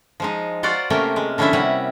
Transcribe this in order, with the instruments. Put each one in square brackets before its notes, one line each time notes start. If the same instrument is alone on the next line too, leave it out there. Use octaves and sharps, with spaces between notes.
[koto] F3 G#3 D#4
F4 F#4 C5 D5 F#5
C3 A3 A#3 C#4 A#4 G5
G#3
D3 F3 C#4 D4 E4 E5
C3 G3 C#4 F#5